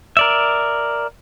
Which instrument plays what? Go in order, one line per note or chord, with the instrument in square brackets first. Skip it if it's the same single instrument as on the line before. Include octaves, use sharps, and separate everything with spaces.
[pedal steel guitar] A#4 D5 E5